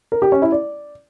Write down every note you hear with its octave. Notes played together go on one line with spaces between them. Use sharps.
A#4
G4
C#4
E4
D5